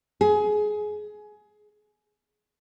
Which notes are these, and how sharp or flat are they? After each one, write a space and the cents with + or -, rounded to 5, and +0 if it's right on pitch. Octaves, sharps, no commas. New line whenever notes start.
G#4 +20